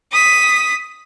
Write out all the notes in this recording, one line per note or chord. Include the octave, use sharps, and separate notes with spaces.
D#6 B6